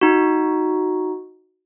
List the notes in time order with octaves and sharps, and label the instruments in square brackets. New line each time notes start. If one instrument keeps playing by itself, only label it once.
[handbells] D#4 F#4